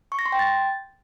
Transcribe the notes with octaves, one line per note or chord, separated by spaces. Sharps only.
C#6
A#6
C6
G5
A6